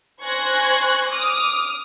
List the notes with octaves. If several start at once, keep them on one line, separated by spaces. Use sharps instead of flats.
C5 G#5 C#6 F#6 G#6 A#6
D6 D#6 F6